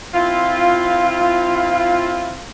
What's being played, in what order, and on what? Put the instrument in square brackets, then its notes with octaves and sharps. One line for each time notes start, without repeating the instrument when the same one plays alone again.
[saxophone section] C4 E4 F4